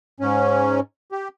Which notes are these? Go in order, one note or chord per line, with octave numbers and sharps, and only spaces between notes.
G#2 C#4
G4